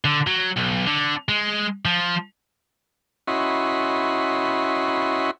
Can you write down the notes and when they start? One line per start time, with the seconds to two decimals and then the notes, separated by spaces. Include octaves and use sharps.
0.05 D3
0.27 F#3
0.57 B1
0.87 D3
1.29 G#3
1.85 F3
3.28 C#4 E4 F#4 D#5 B5 C6